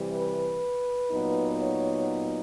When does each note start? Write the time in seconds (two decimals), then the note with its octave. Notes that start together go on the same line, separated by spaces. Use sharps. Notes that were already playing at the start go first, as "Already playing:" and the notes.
Already playing: C3 E3 G3
0.09 B4
1.11 A#2 F#3 B3 D#4
1.62 C#5